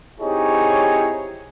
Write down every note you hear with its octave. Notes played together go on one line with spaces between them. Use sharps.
C4 D#4 E4 G4 G#4 C#5